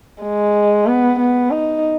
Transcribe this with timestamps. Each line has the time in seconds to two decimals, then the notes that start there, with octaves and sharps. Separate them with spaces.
0.22 G#3
0.86 B3
1.18 B3
1.51 D#4